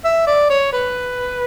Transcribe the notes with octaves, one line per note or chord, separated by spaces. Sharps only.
E5
D5
C#5
B4